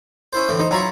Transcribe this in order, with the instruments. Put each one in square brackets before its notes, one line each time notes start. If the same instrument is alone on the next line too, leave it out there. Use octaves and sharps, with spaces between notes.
[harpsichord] C#4 E4 C5
A2 D3 E3
[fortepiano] D#4 [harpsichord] C5
[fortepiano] F#3 A#5 [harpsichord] E4 F4 C#6